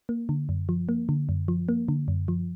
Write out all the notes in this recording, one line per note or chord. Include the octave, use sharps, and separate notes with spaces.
A#3
D3
F#2
F3
A#3
D3
F#2
F3
A#3
D3
F#2
F3